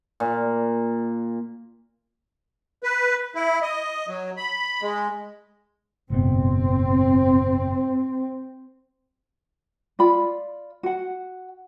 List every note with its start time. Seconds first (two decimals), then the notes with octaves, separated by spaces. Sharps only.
0.20 A#2
2.83 B4
3.35 E4
3.62 D#5
4.08 F#3
4.37 B5
4.82 G#3
6.10 F#1 G#2 B2 C4
9.99 F4 D5 B5
10.83 F#4 F#5